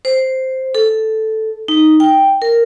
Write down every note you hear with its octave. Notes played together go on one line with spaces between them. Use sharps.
C5
A4
D#4
G5
A#4